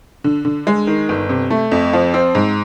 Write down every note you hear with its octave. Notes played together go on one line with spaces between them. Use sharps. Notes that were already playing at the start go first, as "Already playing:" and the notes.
D3
D3
G#3
D#3
G1
C3
A3
F2
F3
C4
G#2